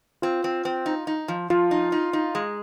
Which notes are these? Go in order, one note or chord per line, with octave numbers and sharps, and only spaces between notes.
C4 F4
C4
C4
D#4
D#4
F3
F3 F4
D#4
D#4
D#4
G#3